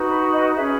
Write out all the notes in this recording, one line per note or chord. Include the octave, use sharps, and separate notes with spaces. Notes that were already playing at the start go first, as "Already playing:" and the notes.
Already playing: D#4 F#4 B4
B5
D#5
C#4 G#4 B4 E5